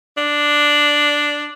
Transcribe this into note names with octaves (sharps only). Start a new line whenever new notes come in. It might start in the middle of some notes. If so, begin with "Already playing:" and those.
D4